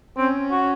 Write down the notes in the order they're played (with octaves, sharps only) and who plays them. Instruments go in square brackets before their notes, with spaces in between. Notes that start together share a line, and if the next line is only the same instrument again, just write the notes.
[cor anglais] C4 [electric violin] C#4
[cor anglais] F#4